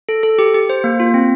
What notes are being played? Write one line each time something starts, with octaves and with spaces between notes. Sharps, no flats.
A4
A4
G4
G4
C5
A#3
F4
C4